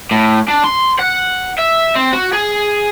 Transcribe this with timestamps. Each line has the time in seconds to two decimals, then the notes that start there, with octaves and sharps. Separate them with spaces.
0.11 A2
0.48 D4
0.64 C6
0.99 F#5
1.58 E5
1.96 C4
2.13 F#4
2.33 G#4